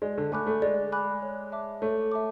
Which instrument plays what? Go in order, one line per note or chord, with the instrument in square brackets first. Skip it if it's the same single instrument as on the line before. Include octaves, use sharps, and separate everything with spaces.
[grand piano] G#3 [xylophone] D5
[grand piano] D3
[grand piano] A3 [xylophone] G#5 B5 D6 F#6
[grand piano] A3
[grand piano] G#3 [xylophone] D5
[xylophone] G#5 B5 D6 F#6
C#5
E5 A5 D6
[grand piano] A3 [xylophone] C#5
[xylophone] E5 A5 D6